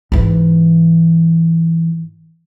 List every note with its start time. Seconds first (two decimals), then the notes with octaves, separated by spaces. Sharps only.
0.12 G#2 E3